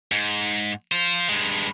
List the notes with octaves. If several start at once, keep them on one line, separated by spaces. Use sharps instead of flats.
G#2
F4 C5
G2 G#3